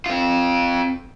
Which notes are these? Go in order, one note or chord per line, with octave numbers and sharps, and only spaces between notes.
C4 F4